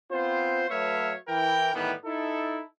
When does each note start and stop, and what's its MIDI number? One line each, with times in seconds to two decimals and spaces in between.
0.11 0.64 59
0.11 0.64 60
0.11 0.64 65
0.11 0.64 72
0.70 1.13 54
0.70 1.13 57
0.70 1.13 71
0.70 1.13 73
0.70 1.13 76
0.70 1.13 77
1.28 1.70 52
1.28 1.70 70
1.28 1.70 79
1.73 1.92 45
1.73 1.92 51
1.73 1.92 52
1.73 1.92 55
1.73 1.92 59
2.04 2.61 63
2.04 2.61 64
2.04 2.61 69